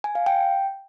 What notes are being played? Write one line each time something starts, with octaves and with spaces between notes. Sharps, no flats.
G#5
F5
G5